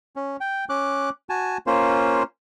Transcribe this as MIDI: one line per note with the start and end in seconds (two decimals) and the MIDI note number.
0.16 0.37 61
0.41 0.65 79
0.69 1.10 61
0.69 1.10 86
0.69 1.10 90
1.29 1.58 66
1.29 1.58 80
1.29 1.58 81
1.67 2.23 58
1.67 2.23 61
1.67 2.23 65
1.67 2.23 72